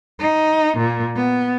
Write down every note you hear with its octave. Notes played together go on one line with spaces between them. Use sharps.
D#4
A#2
B3